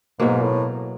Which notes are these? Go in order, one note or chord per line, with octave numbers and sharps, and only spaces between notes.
G#2 B2 F#3 A#3
A2